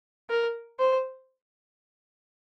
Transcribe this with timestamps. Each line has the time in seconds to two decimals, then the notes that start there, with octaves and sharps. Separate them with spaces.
0.30 A#4
0.79 C5